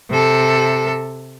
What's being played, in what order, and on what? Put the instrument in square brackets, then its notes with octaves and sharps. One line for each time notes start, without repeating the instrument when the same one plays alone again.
[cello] C3 A4